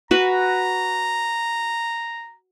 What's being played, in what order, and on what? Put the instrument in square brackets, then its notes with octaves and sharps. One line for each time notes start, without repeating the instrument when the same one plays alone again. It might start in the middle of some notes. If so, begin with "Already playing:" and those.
[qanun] F#4 B4 [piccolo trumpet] A#5